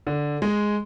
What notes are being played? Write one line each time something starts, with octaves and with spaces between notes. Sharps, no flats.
D3
G#3